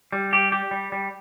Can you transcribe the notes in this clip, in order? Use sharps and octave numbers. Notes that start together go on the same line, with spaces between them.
G3
G4
G4
G3
G3